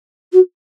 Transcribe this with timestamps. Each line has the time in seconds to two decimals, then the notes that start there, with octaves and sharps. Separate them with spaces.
0.32 F#4